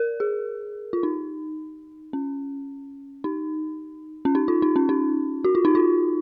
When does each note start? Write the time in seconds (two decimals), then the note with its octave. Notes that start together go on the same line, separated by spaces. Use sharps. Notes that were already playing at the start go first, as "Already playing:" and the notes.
Already playing: A#4
0.20 G#4
0.93 F4
1.03 D#4
2.13 C#4
3.24 D#4
4.25 C#4
4.35 D#4
4.48 F4
4.62 D#4
4.76 C#4
4.89 D#4
5.44 F#4
5.55 F4
5.65 D#4
5.75 F4